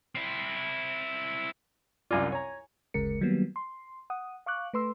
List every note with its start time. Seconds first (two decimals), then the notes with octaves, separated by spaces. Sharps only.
0.15 C4 E4
2.11 C2 F#2 F4 D5 G#5
2.32 C#5 G#5 A#5
2.94 G1 D2 C#3 G#3 A#4 C#7
3.21 D#3 F#3 G3 A#3 B3
3.56 C6
4.10 F#5 D#6
4.46 F5 C#6 D6 F#6
4.74 A3 B4 C6 E6